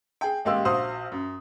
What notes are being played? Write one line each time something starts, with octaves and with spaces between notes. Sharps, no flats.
G#4 G5
A1 G#3 A#3 G4 C6 E6
A#1 F#4 C5 F5 C6 D#6
F#2